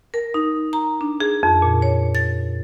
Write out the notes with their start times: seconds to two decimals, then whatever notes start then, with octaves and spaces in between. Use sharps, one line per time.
0.14 A#4
0.34 D#4
0.73 A#5
1.01 D4
1.20 G#4
1.43 F2
1.62 A#2
1.82 C#5
2.15 A6